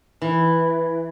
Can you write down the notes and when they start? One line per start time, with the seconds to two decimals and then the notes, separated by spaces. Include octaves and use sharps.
0.22 E3